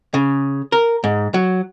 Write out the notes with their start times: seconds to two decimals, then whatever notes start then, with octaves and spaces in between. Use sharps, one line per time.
0.14 C#3
0.72 A#4
1.04 G#2
1.34 F#3